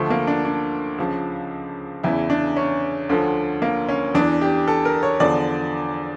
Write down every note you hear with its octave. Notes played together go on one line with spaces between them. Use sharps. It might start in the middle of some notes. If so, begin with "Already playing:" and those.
Already playing: D2 D3 F3 A3
A#3
D4
D4
C#2 C#3 F3
E2 C#3 E3 E4
D4
C#4
D2 D3 F3
A#3
C#4
E2 E3 D4
G4
A4
A#4
C#5
E2 D3 F3 D5